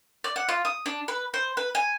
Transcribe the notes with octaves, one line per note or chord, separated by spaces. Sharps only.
D5
F#5
F4
D#6
D4
B4
C5
B4
G#5